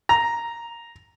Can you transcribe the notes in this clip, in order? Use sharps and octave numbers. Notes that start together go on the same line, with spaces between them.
A#5